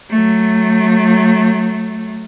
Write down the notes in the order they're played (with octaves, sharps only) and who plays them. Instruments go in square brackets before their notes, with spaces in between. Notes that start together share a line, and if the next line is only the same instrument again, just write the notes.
[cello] F#3 A3